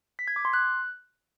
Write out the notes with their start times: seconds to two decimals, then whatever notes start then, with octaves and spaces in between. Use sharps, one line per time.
0.19 B6
0.28 G#6
0.36 D6
0.45 C6
0.54 F#6